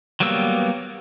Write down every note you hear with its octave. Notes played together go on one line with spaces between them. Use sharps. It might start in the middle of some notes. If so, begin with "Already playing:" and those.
F#3 G3 A#3 B3 E6